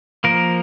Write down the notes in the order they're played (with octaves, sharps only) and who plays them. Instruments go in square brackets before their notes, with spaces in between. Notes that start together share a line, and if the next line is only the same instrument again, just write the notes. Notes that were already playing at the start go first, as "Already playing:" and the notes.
[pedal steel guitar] F3 A#3 A#4